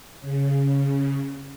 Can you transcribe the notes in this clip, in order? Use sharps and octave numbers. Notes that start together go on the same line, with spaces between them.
C#3